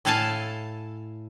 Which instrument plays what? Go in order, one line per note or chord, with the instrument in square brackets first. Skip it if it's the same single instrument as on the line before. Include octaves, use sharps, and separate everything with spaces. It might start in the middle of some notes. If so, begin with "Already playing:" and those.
[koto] A2 E4 A4 F5 G#5 A5